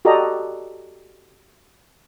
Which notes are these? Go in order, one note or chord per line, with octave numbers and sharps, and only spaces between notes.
F#4 G4 A4 D5 D#5 A#5